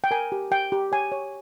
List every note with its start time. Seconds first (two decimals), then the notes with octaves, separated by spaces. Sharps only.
0.04 G5
0.11 A#4 G#5
0.32 G4
0.51 G4 G5
0.72 G4
0.92 C#5 G#5
1.12 C#5